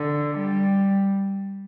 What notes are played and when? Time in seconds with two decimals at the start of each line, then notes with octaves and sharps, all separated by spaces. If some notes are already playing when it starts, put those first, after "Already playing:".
Already playing: D3
0.38 G3